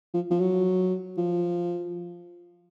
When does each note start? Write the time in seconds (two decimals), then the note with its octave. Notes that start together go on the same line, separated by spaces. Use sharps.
0.14 F3
0.31 F3
0.40 F#3
1.17 F3